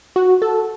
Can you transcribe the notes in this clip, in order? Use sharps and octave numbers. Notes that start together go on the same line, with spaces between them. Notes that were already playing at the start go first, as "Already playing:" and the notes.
F#4
A4